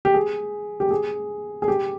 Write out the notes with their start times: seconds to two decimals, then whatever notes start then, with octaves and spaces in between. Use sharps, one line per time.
0.05 G4
0.14 G#4
0.80 G4
0.91 G#4
1.62 G#4
1.68 G4